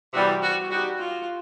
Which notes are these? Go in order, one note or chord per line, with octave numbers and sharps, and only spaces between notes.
C3 E3 G3 B3 F#4
F#4
G3 B3 D#4 F#4 G4 B4
F4